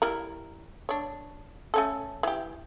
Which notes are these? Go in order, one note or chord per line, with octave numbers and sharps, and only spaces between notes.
G3 E4 A#4
D4 C#5
A3 C#4 A4
E3 G4